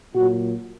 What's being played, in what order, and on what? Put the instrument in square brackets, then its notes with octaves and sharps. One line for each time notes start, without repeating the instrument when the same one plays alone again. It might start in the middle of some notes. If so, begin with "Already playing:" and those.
[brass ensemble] A#2 F#3 F#4